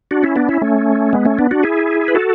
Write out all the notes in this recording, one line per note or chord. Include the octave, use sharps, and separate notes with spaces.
D4 F#4
C#4 E4
B3 D4
C#4 E4
A3 C#4
G#3 B3
A3 C#4
B3 D4
D4 F#4
E4 G#4
B4
F#4 A4